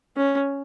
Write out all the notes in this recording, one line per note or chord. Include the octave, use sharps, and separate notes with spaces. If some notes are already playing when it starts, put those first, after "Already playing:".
C#4